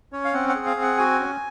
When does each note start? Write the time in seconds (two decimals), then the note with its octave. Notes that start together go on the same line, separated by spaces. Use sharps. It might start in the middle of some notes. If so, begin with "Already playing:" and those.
0.12 C#4 C#5
0.25 F5
0.33 C4 F#5
0.49 F#5
0.55 G#4
0.66 F5
0.77 C4
0.82 F#5
0.98 F#4 G#5
1.20 C#4